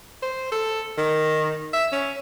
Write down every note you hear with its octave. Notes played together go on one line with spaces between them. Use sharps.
C5
A4
D#3
E5
C#4